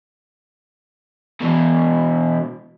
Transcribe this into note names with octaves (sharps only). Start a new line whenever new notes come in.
B2 E3